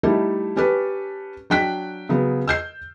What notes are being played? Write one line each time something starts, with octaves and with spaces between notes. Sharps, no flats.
G3 A3 D#4 E4 G4 A4
C#4 G4 A4 B4
F#3 D4 G5 F#6 B6
C#3 F#3 B3
E6 G6 C7